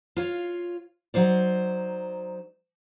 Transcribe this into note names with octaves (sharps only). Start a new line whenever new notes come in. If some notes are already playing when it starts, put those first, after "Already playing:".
F4 C#5 F5
F#3 D#4 C5 D5